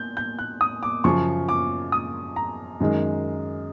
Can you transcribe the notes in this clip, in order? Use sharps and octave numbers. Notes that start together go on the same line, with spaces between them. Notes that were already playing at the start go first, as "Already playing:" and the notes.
Already playing: G6
G6
F#6
D#6
D6
F#2 C#3 F3 C#6
D6
D#6
A#5
F#2 D#3 G#3